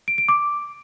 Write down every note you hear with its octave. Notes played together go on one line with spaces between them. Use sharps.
D7
D7
D6